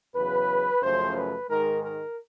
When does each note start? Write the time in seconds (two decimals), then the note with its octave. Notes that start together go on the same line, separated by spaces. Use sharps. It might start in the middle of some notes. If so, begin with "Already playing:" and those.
0.15 E2 C#3 F#3 B4
0.82 F#2 C#3 F3 A3 C5
1.15 B4
1.49 G#2 D#3 G#3 A#4
1.83 A#4